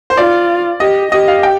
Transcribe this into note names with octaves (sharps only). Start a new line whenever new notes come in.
C5
F4 D5
G4 D#5
G4 D#5
F5
G5